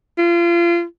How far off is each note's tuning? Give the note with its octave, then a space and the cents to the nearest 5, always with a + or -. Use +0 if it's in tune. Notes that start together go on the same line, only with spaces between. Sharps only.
F4 -30